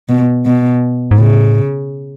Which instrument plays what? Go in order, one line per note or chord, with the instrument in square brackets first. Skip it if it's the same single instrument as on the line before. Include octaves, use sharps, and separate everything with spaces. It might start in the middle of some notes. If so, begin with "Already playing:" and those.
[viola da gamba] B2
B2
[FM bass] G#2
[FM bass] A2 [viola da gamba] C#3